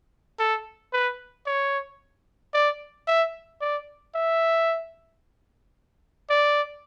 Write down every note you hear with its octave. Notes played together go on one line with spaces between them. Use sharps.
A4
B4
C#5
D5
E5
D5
E5
D5